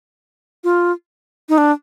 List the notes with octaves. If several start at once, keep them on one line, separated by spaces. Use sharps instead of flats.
F4
D#4
D4